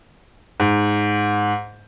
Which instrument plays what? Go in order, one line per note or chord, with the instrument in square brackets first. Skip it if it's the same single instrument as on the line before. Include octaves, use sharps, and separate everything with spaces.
[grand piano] G#2